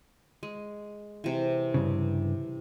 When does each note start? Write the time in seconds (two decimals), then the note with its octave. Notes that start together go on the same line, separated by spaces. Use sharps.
0.43 G#3
1.24 C3 E3
1.74 G2 C#3